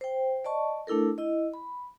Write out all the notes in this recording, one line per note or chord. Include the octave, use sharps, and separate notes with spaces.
C5 G5
D5 D#5 A5 C#6
A3 D4 E4 A4 A#4
E4 D#5
B5